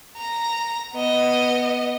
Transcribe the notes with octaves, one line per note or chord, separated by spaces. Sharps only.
A#5
B3 D#5